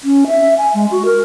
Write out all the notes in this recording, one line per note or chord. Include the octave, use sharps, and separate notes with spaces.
C#4
E5
G#5
G#3
F#4
A#4